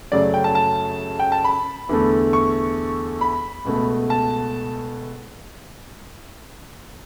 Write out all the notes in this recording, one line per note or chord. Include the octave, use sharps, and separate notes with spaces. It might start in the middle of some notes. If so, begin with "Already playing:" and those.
F#2 C#3 F#3 A3 D5
G5
A5
A5
G5
A5
B5
E2 D3 A3
C#6
B5
C#2 B2 A3
A5